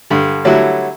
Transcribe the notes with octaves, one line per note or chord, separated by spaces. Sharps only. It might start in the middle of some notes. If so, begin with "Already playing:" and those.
G2 D3
D3 F#3 G3 A3 E4 F#4